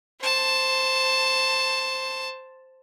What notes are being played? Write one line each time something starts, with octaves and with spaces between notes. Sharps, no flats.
C5 A5